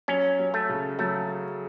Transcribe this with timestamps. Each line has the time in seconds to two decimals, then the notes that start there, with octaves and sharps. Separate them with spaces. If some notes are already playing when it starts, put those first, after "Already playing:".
0.08 F#3 C#4
0.39 F#3
0.54 A3
0.69 C#3
0.99 F#3 A3